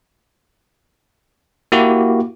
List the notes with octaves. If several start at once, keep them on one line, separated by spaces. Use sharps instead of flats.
A#3 E4 F#4 G4